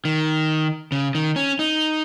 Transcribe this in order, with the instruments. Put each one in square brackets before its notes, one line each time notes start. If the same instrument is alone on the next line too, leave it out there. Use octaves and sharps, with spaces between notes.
[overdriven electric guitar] D#3
C#3
D#3
C#4
D#4